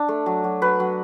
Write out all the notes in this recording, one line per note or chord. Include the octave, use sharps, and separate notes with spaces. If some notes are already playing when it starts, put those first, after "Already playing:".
Already playing: D4
A3
F#3
F#3
F#3 B4
F#3